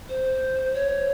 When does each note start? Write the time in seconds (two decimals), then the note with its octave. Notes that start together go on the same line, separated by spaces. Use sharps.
0.09 C5
0.74 C#5